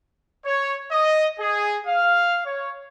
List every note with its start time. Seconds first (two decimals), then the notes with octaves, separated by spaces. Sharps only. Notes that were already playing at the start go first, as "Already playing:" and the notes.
0.45 C#5
0.91 D#5
1.40 G#4
1.87 F5
2.45 C#5